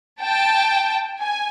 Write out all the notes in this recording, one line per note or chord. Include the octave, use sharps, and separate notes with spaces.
G5 A5
G#5